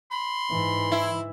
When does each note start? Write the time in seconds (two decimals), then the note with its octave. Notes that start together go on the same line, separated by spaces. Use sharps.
0.11 B5 C6
0.50 G#2 E3
0.92 E4